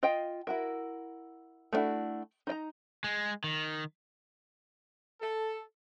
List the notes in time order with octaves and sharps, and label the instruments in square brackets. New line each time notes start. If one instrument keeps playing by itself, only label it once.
[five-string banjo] F4 D#5 F5 G5
E4 F#4 A#4
A3 B3 D4 E4 F#4
D#4 D5 A#5
[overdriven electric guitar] G#3
D#3
[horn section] A4